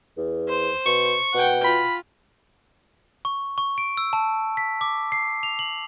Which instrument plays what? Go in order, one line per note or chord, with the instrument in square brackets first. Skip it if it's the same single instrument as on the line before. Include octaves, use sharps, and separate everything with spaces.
[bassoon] E2
[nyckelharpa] C5
[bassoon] B2 [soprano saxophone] C#6
[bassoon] B2 [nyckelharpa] F#5 G5
[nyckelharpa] F4 [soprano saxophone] B5
[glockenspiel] C#6
C#6
D7
E6
A5
B6
D6
C7
F7
F#7